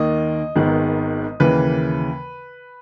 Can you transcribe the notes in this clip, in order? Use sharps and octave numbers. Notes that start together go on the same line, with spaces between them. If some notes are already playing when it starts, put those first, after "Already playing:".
Already playing: D#2 D#3 A#3 D#5
G#1 G#2 D#3 G#3 B3
D#2 C#3 E3 A#3 B4